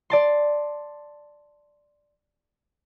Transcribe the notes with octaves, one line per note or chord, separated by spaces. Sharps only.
D5 A5 C6